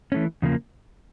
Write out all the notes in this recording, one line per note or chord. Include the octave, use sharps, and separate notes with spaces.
E3 A3 C#4
E2 C#3 F3 A#3